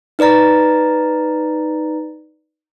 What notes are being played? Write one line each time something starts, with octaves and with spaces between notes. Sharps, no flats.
D#4 B4 D5 A#5 A6